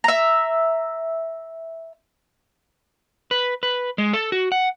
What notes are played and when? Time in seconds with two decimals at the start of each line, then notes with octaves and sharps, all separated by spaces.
0.04 E5 A#5
3.31 B4
3.63 B4
3.98 G#3
4.13 A4
4.32 F#4
4.52 F#5